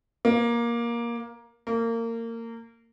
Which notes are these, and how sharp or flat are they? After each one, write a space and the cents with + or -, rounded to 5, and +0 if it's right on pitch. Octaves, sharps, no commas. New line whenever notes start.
A#3 +15
A#3 -25